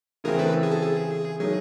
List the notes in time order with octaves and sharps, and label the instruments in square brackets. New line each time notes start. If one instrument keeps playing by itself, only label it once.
[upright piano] C#3 E3 A3 C4 E4 [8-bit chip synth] G#4 A#4
[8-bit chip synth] A4 B4
G#4
A4
G#4
[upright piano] D#3 F#3 A3 [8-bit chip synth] G#4